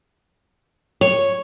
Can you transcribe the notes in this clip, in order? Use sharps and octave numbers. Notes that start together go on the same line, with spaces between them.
C#5